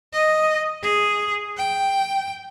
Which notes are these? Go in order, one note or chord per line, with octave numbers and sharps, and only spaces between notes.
D#5
G#4
G5